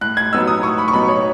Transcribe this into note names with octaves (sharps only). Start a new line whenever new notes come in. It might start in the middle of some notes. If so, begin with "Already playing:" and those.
A2 F#6
G#6
F#3 B3 D#4 E6
D#6
A2 C#6
B5
C#6
F#3 B3 D#4 B5
C#5